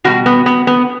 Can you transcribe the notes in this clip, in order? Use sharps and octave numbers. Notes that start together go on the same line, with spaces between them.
B2 G3 F#4
B3
B3
B3